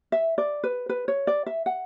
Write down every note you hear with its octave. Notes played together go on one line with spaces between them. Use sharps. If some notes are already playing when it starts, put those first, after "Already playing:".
E5
D5
B4
B4
C#5
D5
E5
F#5